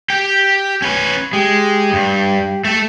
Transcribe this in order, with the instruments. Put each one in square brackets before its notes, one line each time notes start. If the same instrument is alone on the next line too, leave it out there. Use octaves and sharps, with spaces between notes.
[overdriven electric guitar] G4 G5
C#4 B4
[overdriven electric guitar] G#3 [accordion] G4
[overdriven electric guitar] G2
A3 A4